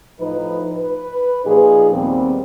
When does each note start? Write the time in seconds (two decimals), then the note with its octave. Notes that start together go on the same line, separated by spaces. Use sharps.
0.20 A2 F3 D#4 B4
0.78 B4
1.45 A#2 F3 D#4 G#4
1.92 D#2 G3 B3 C4